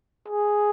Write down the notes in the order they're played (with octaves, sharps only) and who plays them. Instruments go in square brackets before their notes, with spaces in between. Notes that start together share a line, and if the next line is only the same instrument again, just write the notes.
[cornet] G#4